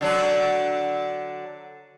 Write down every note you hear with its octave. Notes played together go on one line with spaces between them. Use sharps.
D3 F#3 D4